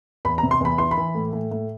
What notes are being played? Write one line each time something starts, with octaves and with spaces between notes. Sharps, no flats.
E2 B5
A#5
C3
C6
E2 B5
E3 C6
B5
E3
A2
A2
A2